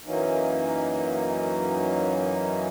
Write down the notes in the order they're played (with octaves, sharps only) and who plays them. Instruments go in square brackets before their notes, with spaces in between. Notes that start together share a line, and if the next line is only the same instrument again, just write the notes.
[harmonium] F#2 E3 F#3 A#3 C#4 D#4